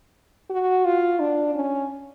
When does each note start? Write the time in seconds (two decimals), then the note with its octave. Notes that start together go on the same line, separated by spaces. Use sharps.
0.50 F#4
0.85 F4
1.20 D4
1.55 C#4